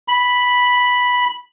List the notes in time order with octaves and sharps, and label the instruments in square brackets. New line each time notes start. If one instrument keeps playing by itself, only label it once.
[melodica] B5